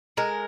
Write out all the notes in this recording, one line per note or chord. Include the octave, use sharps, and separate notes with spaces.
G#3 A#4